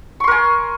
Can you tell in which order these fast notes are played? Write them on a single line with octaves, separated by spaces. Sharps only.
C#6 C6 A#4 G#5